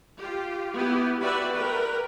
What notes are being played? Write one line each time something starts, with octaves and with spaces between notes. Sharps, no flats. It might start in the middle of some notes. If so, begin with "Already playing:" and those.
F4 G4
B3 E4 G4
F#4 G4 B4 D5 E5
A#4 B4 G5